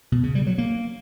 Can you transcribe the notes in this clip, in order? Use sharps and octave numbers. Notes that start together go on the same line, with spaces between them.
B2
C#3
G3
F#3
A#3